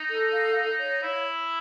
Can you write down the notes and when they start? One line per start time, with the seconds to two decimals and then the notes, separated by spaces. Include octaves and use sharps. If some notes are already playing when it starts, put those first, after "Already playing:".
Already playing: D#4
0.09 A4
0.32 F5
0.56 F5
0.80 C#5
1.03 E4 C#5